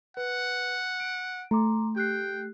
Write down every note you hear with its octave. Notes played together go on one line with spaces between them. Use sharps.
B4 F#5
D7
A3 A#5 C6 D6
G4 G5 F#6 C7